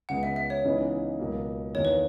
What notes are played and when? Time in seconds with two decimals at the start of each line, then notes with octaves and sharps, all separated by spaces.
0.09 C#2 C#3 G#3 B3 F#5
0.23 E5
0.36 E5
0.50 C#5
0.64 C#2 C#3 E3 B3 D#4
1.19 C#2 B2 F#3 A#3
1.75 E2 D#3 A#3 C#5
1.85 B4